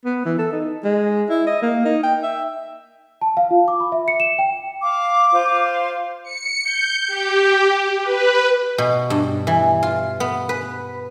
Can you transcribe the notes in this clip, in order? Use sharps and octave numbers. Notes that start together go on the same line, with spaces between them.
B3
E3
A4
D#4
G#3
E4
D#5
A#3
D#4
G5
E5
A5
F5
F4
D6
B5
E5
C#7
E7
G5
F5 D6
F4 C5 F5
C#7
G6
G4
B4
B2
G2
E3
F4
B3
B4